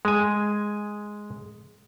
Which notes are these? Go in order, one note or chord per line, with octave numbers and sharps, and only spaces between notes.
G#3 G#5